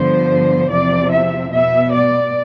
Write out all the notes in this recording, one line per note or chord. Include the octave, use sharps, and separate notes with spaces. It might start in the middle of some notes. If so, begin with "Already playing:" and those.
Already playing: G2 D3 F3 B3 C5
E2 C3 F3 C4 D5
E5
B2 B3 E5
D5